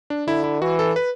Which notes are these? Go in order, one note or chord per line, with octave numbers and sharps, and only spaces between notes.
D4
D3 E4
E4
E3 F#4
A4
B4